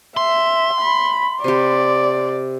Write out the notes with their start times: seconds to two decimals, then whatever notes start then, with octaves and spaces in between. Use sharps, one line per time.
0.17 E5 C6
0.81 B5
1.44 C3 G4 D5